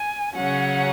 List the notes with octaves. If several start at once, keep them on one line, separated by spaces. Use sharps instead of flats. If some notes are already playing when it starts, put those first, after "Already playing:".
Already playing: G#5
C#3 F#3 C#4 F#5